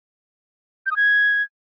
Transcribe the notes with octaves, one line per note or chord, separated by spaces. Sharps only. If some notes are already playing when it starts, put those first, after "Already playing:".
G6
D#6
G#6